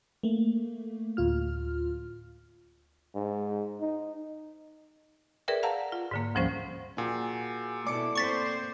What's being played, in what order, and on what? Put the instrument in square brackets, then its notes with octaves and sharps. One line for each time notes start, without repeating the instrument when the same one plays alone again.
[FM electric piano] A3 A#3
D2 A2 F4 F6
[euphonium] G#2
D#4
[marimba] G#4 A#4 B4 D5 E5 G5
F5 F#5 A5 A#5
F4
G#2 D3 A#3
D2 G#2 F3 G3 C#4 C5
[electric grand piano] A#2 [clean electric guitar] F#4 G#4
[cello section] B2 E4 [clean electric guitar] A4 D5 [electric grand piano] D6 C#7
[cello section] A#3 C4 C5 [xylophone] C#6 A6 B6